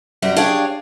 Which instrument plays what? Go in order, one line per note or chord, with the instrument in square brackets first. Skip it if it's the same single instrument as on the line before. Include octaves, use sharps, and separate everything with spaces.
[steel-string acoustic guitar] F#2 G3 A#5
D4 G4 G#4 C#5 F5 G5